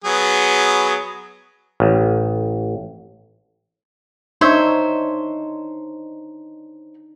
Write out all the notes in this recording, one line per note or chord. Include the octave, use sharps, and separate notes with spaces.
F#3 B3 G#4
A1
D4 D#4 C5 C#5 E5